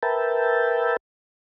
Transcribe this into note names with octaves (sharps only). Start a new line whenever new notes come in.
A#4 B4 E5 G5 A5